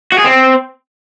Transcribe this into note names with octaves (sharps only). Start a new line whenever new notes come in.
F#4
G#4
C4